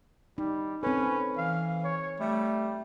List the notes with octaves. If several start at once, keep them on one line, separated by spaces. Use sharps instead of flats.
G3 D#4
C4 C#4 A4 B4
E3 F5
C#5
G3 A3